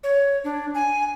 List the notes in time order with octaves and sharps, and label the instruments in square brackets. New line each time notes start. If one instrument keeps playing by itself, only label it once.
[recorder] C#5
D4
G#5